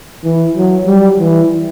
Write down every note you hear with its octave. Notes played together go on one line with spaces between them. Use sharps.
E3
F#3
G3
E3